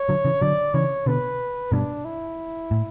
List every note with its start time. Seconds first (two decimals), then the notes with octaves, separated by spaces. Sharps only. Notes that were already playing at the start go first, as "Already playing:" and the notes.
Already playing: C#5
0.09 D3 F#3
0.25 C#3 E3
0.41 D3 F#3 D5
0.74 C#3 E3 C#5
1.06 B2 D3 B4
1.72 G2 B2 D4
2.05 E4
2.71 A2